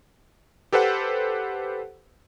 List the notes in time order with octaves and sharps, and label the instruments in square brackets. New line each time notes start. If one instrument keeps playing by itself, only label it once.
[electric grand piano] G4 A4 B4 C5 F#5